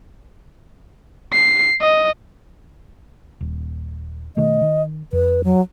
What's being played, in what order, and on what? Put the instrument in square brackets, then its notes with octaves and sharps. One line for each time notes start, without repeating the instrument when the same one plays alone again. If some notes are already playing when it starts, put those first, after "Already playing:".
[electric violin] C7
D#5
[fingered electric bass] D#1
[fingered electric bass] B2 D#3 A3 [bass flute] D#5
[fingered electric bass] D#3
[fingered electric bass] F2 [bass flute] B4
[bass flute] F#3